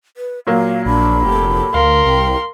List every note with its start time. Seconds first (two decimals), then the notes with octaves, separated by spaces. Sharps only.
0.17 B4
0.47 A#2 F#3 A#3 F5
0.85 A#1 D4 B5
1.25 F1 G4 A4
1.74 D2 A#4 F5 C6
2.06 C2 G5